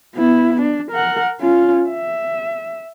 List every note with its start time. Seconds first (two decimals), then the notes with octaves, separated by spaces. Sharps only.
0.16 B3 E4
0.61 D4
0.91 A#4 F#5
1.40 C#4 F4
1.90 E5